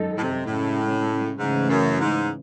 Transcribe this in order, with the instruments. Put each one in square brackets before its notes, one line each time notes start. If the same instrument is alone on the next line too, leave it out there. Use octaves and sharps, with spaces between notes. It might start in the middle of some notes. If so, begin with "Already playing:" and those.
Already playing: [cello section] F#2 D#3 G#3 D#4 A4
[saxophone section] A2
C3
[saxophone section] A2 [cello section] C#3 G#3 C#4
[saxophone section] G#2 [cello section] C#3 E3 A3
[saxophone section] F#2
G#2